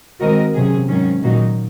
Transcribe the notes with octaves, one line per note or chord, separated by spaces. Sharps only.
D#3 G#3 C4 F#4 A#4 D#5
C3 F#3 C#4 G#4
G#2 D#3 F#3 C#4
A#2 D#3 F#3 A#3 D#4 F#4